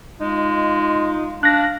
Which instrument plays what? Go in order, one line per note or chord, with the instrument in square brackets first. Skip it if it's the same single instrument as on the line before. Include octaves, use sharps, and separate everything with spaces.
[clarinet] G#3 [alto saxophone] D#4 [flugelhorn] F4
[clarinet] D4 [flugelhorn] F5 [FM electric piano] F#6 A#6